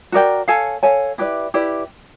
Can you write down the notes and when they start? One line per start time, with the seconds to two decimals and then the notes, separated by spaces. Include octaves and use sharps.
0.12 F#4 A#4 D5 G5
0.48 A4 C#5 F5 G#5
0.83 A4 C#5 F5 G#5
1.18 E4 G4 B4 D5
1.54 E4 G4 B4 D5